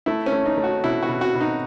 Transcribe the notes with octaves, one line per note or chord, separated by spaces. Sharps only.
A3 E4
C#4
A3
D#4
A3
F#4
B2 E4
F#4
B2
F#4
B2
D#4